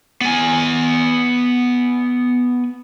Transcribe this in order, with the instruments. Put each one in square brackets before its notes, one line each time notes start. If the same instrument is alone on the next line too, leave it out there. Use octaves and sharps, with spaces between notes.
[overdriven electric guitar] B3 G#5